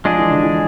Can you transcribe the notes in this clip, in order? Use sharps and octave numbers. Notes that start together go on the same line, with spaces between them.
F3 G#3 D4 G#4
E3
D3
E3